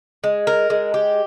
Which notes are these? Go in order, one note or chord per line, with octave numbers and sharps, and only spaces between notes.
G#3
A#4
G#3
G4